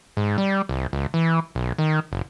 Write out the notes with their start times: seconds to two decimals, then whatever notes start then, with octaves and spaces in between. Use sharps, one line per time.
0.17 G#2
0.38 G3
0.69 C2
0.93 C#2
1.14 E3
1.55 B1
1.78 D#3
2.12 F#1